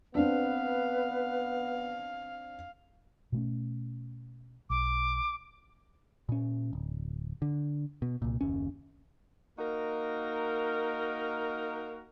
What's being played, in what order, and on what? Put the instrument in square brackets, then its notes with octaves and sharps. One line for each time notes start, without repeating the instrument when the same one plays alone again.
[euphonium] B3 [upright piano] C4 D4 [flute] B4 [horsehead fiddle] F5
[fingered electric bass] B2 A3 C#4
[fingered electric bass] B1 [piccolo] D6
[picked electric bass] A#2 C#4
D1
D3
B2
C2 A#2
F#1 D#2 C#4
[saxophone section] A#3 D#4 F#4 A#4